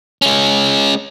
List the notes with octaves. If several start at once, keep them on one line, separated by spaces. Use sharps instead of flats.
G#3 C#4